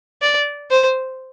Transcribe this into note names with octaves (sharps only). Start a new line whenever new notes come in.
D5
C5